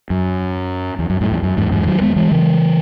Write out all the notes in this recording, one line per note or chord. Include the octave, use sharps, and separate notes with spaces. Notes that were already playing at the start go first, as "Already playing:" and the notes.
F#2
E2
F#2
F#2 A2
E2
F#2
E2 G#2
E2 G#2
D#3 F#3
G#3 B3
E3 G#3
C#3 E3